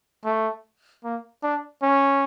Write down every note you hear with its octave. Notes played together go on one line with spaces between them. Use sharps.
A3
A#3
D4
C#4